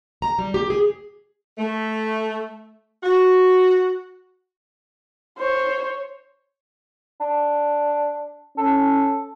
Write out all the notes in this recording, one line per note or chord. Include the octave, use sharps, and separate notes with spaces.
A#5
G3
G4
G#4
A3
F#4
C5 C#5
D4
C#4 A4